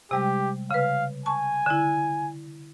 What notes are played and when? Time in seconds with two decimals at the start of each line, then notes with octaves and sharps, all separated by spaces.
0.11 C3 G3 G#3 G4
0.71 C#3 B4 F5
1.26 G#5 A5 C#6
1.66 D3 E4